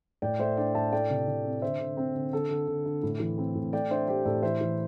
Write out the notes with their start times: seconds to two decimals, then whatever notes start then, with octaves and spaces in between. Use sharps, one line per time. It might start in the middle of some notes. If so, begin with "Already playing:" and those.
0.22 A2 D5 G5
0.39 A3 C5 E5
0.57 D4 D5 G5
0.75 A2 E5 A5
0.92 A3 D5 G5
1.10 C3
1.27 C3
1.45 C4
1.62 D3 C5 E5
1.80 D3
1.97 C4
2.15 D3
2.33 D3 A4
2.50 D3
2.68 D3
2.86 D3
3.03 A2
3.20 E3
3.38 C4
3.55 A2
3.73 A3 D5 G5
3.91 D4 C5 E5
4.08 A3 G4 C5
4.25 A2 A4 D5
4.43 E3 C5 E5
4.61 E3